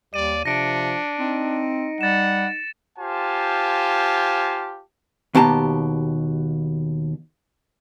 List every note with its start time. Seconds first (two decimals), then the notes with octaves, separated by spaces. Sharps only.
0.14 D#2 G3 D5 D#7
0.45 C3 F3 D4 A#6 C#7 D7
1.19 C4 D#4
2.01 G3 F#5 A6 E7
2.99 F4 G4 C5 F5 G#5 A5
5.35 D#2 B2 G4 A5 A#5